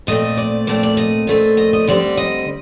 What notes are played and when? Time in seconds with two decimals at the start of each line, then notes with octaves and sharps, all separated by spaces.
0.07 A#2 A3 C4 D#5
0.37 D5
0.67 A#2 A3 C4 D5
0.83 D5
0.97 D#5
1.27 A#2 A3 C4
1.57 D#5
1.73 D#5
1.88 D3 G3 C4 D5
2.17 D#5